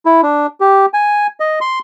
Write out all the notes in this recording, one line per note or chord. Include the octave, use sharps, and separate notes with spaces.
E4
D4
G4
G#5
D#5
C6